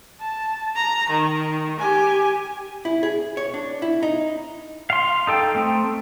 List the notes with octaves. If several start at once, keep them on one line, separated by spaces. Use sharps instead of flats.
A5
A#5
D#3
G4 G#5
E4
G#4
C#5
D4
E4
D#4
F5 C6
D#4 A4 G5
A3 C4